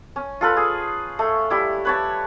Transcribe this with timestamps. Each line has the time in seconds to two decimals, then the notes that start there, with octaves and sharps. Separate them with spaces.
0.16 C#4
0.41 F4 A4 B4
0.57 G#4
1.19 A3
1.50 G3 E4
1.85 B4 C#5 A5